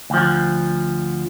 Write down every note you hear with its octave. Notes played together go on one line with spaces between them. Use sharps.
D2 F3